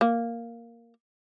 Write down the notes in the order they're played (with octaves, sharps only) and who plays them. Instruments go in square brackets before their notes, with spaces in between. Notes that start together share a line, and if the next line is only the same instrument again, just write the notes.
[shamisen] A#3